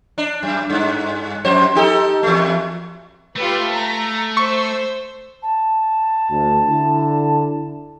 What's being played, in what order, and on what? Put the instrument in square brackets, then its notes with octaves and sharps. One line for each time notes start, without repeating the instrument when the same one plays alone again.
[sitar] D4
F#2
G2
F2 C5
D#4 G4 A4
E2 A3
[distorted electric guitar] A3 [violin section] F4 G4 B4
[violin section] A#5
[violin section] C5 E6 [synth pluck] C#6
[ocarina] A5
[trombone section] D2
D3 E4